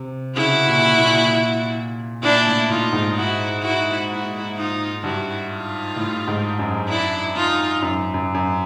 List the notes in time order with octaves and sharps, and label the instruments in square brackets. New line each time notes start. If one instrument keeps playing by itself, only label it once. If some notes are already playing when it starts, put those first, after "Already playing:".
Already playing: [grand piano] C3
[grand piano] C#3 [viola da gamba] E4 F#4
[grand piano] A#2
A#2
[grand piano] A#2 [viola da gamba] D4 E4
[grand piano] A2
[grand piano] A2 [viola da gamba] D#4 F4
[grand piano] G#2
[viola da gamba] E4 F#4
E4 F#4
E4 F#4
D#4 F4
[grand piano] G2 [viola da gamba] E4 F#4
[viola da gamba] D#4 F4
[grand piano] A2
G#2
F#2
[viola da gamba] D4 E4
D#4 F4
[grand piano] F#2
F#2
F#2